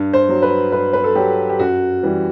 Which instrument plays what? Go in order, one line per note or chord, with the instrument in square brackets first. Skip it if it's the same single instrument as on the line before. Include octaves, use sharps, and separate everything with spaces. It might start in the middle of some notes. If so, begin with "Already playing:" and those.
Already playing: [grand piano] G2
C5
F#3
B4
G2 B4
B4
A4
F#3 G4
G4
F#2 F#4
E3 G3